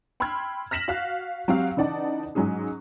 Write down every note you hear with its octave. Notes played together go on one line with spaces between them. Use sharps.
G5 B5 C6 E6 F6 G#6
F6 A#6 B6 E7 F#7
F#4 F5 F#6
F#3 C4 F#4 G4 F5
C#3 E3 D#4 D5 F#5 A5
G#2 F#3 G#3 C#4 G#4